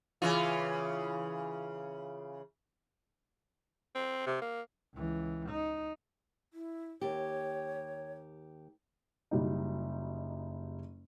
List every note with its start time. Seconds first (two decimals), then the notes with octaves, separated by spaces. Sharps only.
0.22 C#3 E3 F4
3.95 C4
4.26 C3
4.42 A#3
4.94 C#2 E3
5.50 D#4
6.53 E4
7.01 D#2 G4 C#5
9.31 F#1 G3 D#4